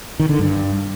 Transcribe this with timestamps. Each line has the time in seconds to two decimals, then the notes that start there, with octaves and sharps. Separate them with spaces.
0.19 D#3
0.29 D3
0.39 G2